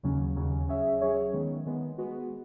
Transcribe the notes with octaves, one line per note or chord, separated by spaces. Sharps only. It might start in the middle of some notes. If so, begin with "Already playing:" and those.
D#2 C#3 F#3 C#4
D#2 C#3 F#3 C#4
F#3 C#4 G#4 C#5 E5
F#3 C#4 G#4 C#5 E5
D#3 G#3 B3
D#3 G#3 B3
G#3 B3 F#4